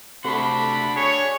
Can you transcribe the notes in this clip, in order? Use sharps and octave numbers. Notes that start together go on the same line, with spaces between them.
C3 A3 D4 F#4 B5 C6
G#4 C#5